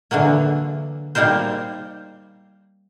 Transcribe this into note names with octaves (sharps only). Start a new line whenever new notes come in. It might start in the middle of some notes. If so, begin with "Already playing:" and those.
D3 E3 F#3 A#3
G3 A#3 D#4 A#4 C5